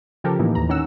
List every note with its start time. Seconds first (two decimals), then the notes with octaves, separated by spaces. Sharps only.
0.24 C#3 F3 G4 A4 A#4
0.39 A2 D#3 E3 A#3 D#4
0.55 D#2 A#5
0.69 D#3 C#4 F#5 E6